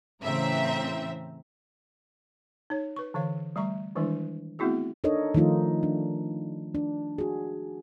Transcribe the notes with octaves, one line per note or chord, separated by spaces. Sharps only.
A2 C#3 E3 C4 E5 A#5
D#4 C#5
B4 C#6
D3 E3 C#5 F5
G3 A3 E5 A#5 C#6
D#3 E3 G3 G#3 D4 E4
A3 B3 C4 E4 F#4 G#4
D4 D#4 A4 A#4 C#5 D#5
D#3 F3 A3 D#4 F4
D4
D4
F#4 G#4